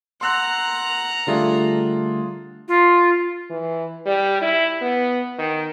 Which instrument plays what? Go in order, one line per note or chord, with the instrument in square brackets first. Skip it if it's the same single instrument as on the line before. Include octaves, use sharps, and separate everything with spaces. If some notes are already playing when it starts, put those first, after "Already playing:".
[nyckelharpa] F#5 A#5 [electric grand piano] C6 E6 F#6
[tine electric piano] D3 G3 A3 [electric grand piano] D4 F4 G#4
[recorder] F4
[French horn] E3
G3
E4
B3
D#3